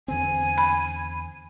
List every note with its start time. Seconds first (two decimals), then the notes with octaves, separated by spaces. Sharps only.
0.08 E2 D3 C4 G#5
0.58 B5